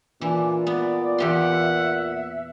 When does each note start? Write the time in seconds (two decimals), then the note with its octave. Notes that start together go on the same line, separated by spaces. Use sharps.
0.21 A#2 E3 D4
0.67 B3 D5
1.18 E2 G4 E5 F#5 C6